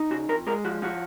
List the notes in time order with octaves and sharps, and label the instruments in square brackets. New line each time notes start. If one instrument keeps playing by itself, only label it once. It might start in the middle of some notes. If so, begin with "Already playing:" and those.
Already playing: [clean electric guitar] D#4
C#3 F#4
F2 A#4
G#3 A#4
F3 F#4
F3 F#4